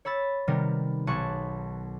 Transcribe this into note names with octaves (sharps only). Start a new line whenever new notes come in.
C#5 B5 E6 A6
C3 D#3 G3 B3 A#4
B1 G#4 A5 C#6 F#6